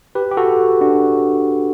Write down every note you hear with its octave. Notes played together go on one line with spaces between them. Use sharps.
G4 B4
G4
F#4 A4
D4 F#4